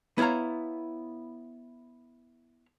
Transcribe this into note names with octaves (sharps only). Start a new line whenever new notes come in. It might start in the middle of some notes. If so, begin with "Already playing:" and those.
B3 E4 C#5 F5 A#5